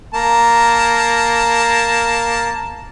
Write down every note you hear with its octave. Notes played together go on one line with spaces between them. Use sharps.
A#3 A5 A#5